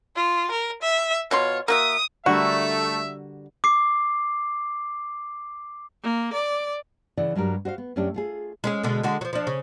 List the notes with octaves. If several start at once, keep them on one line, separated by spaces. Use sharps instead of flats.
F4
A#4
E5
B2 F4 C#5 C6
A#3 F#4 E5 D#6
D3 G3 A3 F#4 A#4 E5
D6 C7
A#3
D5
C#3 E3 D5 F#5
G2 F#3 G3 A#4
F#4 C5 D#5 F5
B3
F#2 A3 C#4 D4 G4
A3 F4 G#4
G#3 C#4 G#4
B2 D3 G#3
D3 G#3 F#4
F3 F#3
F3 D4
C#3